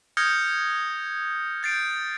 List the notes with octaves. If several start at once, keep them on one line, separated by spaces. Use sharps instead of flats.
D#6 F6 G6 G#6 A#6 C#7
G6 A6 C7 D7